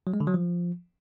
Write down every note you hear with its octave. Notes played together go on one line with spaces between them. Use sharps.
F#3
G#3
D3
F#3
F3